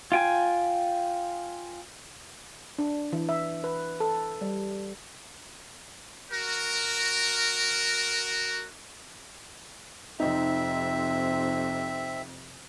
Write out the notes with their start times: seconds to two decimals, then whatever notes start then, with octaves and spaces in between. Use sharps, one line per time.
0.12 F4 G5 G#5
2.78 D4
3.12 E3
3.29 E5
3.64 B4
4.00 A4
4.41 G3
6.31 F#4 A#4
10.20 F2 C3 C4 D#4 E5